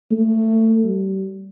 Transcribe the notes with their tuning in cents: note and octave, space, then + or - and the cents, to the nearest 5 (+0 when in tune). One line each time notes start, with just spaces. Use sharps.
A3 +20
G3 -35